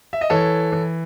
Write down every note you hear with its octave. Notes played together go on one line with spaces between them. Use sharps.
E5
D#5
E3 A4 C#5
E3